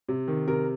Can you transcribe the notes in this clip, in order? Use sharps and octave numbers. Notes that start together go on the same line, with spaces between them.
C3
D#3
C3 A#4